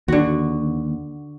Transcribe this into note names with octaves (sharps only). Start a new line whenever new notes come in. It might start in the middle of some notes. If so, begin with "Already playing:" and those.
D#2 D3 F#4